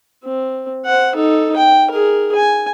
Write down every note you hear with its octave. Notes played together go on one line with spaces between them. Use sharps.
C4
C5 F#5
D#4 A4
G5
G#4 A#4
G#5